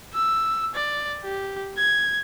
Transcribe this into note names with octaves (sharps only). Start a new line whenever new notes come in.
E6
D5
G4
G#6